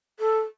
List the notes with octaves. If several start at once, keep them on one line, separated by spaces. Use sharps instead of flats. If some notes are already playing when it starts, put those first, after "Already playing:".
A4